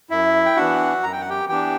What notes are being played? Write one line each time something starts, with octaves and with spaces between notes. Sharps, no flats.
F#2 E4 E5
G5
E3 B3 D4 F#4 F#5
F#2 A#5
G5
F#5
G4 G5
E3 B3 D4 G4 G5